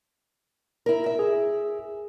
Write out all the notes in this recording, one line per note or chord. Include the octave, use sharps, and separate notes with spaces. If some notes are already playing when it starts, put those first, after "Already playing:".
E4 A#4
E5
G#4